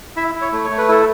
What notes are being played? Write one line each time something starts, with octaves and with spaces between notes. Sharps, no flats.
E4 E5
E4
C#5
A3
C#5
A3
B4
E4 A4